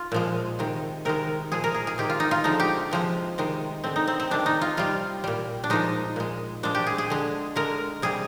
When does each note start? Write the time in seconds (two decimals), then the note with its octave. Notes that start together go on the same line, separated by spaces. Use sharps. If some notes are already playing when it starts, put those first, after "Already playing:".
Already playing: F4
0.12 A#2 F3 G#3
0.59 C3 D#3 G#3
1.05 C3 D#3 G#3 A#4
1.52 A#2 F3 G#3 G#4
1.64 A#4
1.74 G#4
1.87 G#4
1.98 C3 D#3 G#3 G4
2.10 F4
2.20 D#4
2.31 F4
2.44 D3 F3 G#3 D#4
2.60 G4
2.91 C3 F3 G#3
3.38 C3 D#3 G#3
3.84 D3 G#3 C4
3.96 D#4
4.08 C4
4.20 C4
4.31 C3 D#3 G#3 D4
4.46 D#4
4.61 F4
4.77 C3 G3 F4
5.24 A#2 G3
5.64 D4
5.70 A#2 F3 G#3 D#4
6.16 A#2 G#3
6.63 A#2 F3 G#3 D4
6.75 G4
6.87 G#4
6.98 G#4
7.10 D3 G#3
7.56 D3 G#3 A#4
8.02 C3 G3 G#4